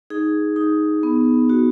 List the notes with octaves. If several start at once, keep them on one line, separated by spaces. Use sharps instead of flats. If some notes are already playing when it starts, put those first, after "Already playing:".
D#4 G#4
D#4
B3
F#4